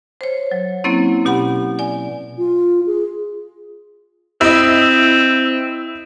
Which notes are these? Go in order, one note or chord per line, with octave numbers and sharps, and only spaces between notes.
C5 C#5
F#3
F#3 A#3 C4 C#4 E4
B2 G4 F#5 B5
D5 G#5
F4
G#4
C4 E4 D#5